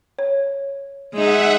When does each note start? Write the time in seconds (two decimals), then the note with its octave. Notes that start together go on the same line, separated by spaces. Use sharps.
0.19 C#5
1.14 G#3 D#4 E5 F#5